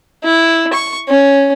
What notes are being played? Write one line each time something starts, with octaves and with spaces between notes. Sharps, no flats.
E4
C#6
C#4